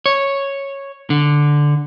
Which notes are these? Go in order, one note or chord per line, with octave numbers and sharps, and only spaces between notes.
C#5
D3